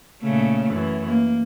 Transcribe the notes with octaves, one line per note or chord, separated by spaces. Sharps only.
A#2 C#3 A3
F#2 E3
A#3